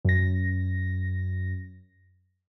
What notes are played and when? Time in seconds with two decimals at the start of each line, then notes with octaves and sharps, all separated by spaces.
0.05 F#2 A#6